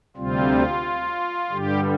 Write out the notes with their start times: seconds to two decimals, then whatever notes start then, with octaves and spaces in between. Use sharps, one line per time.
0.16 D2 C3 G3 C4 F4
1.51 G2 D3 G3 G4